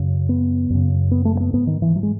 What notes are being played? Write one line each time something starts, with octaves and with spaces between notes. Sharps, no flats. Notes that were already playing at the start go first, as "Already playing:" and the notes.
Already playing: F#2 C#3
B3
F#2 C#3
B3
A3
A3
B3
G#2 B3
D#3
E3
F#3
G#3